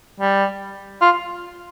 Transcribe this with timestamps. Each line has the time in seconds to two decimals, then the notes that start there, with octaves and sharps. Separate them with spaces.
0.20 G3
1.01 F4